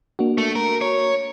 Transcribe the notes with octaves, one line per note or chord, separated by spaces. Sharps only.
A#3 D4 F#4
A3
A#4
C#5